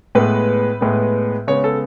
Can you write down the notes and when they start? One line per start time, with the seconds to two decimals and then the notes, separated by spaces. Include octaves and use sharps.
0.15 A2 G#3 B3 B4
0.81 A2 G#3 B3
1.48 C#3 G#3 B3 C#5
1.64 A4